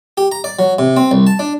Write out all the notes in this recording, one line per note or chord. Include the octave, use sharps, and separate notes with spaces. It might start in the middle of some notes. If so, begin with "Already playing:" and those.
G4
A#5
D5
F#3
C3
C4
C2
A5
D4